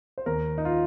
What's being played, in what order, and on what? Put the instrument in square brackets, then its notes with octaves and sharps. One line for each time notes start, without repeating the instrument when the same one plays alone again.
[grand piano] C5
D#2 A#4
D#4
F4